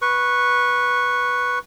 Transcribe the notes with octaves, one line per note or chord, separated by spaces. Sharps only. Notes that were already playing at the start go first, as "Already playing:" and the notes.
B4 C#6